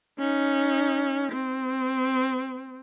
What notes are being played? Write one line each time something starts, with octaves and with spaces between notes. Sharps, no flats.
C#4 D#4
C4